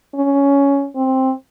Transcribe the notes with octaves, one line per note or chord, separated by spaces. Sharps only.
C#4
C4